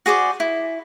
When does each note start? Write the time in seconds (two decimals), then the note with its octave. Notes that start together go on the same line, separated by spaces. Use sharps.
0.06 F#4 G#4 C5 D5
0.40 E4